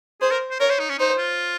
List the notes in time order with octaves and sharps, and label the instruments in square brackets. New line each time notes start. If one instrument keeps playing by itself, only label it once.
[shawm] G#4 [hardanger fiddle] C5
[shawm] A#4
C5
[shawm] A#4 [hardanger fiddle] C#5
[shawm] C5
D#4
C#4
[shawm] D#4 [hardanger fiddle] C5
[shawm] F4